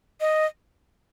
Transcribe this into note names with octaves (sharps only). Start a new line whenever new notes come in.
D#5